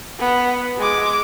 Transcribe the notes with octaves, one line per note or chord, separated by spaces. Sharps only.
B3
G#3 D6